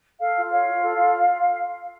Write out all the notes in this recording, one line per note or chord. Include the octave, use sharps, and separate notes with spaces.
A4 F5
F4
C#5 F5
F4
A4
F4